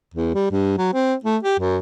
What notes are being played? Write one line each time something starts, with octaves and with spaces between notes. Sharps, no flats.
E2
G3
G2
F#3
C4
A3
G4
F#2